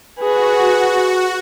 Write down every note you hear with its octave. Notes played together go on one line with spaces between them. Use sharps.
F#4 G#4 B4